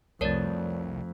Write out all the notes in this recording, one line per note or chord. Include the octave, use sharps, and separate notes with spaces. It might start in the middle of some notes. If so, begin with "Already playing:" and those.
C2 F2 A3 A#4 C#5 D5 A6